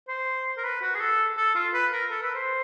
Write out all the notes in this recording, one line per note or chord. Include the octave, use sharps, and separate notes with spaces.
C5
A#4
B4
F#4
G#4
A4
A4
F4
B4
A#4
A4
B4
C5